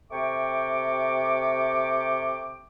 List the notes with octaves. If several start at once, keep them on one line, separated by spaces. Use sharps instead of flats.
C3 A3 G5 C#6 D6